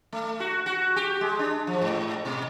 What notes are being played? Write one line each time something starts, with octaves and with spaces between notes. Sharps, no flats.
A3
F#4
F#4
G4
G#3
D4
F3
G#2
B2